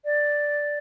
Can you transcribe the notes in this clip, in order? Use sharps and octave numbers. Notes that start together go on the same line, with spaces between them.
D5